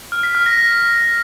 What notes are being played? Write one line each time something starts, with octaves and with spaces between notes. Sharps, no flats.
F6
B6
F6
A#6
A#6